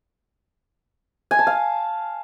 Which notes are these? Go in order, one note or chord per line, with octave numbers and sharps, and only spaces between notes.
G#5
A5
F5